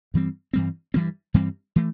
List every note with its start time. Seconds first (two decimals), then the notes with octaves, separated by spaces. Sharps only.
0.14 G2 E3 G3 C4
0.53 G2 E3 G3 C4
0.94 G2 E3 G3 C4
1.34 G2 E3 G3 C4
1.76 E3 A3